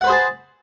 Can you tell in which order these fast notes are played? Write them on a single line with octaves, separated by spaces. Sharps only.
F#5 B4 C5 G#4 A5